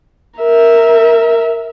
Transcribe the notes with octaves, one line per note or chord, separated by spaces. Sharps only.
A#4 E5